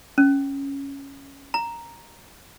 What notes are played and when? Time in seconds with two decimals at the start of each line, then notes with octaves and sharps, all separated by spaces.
0.18 C#4
1.54 A#5